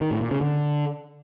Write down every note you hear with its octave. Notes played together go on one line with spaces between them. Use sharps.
D#3
A2
A#2
C#3
D3